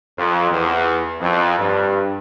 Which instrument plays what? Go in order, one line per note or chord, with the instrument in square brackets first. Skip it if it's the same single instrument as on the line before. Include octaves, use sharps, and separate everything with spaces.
[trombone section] F2
E2
F2
G2